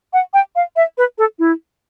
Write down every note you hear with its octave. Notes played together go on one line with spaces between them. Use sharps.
F#5
G5
F5
E5
B4
A4
E4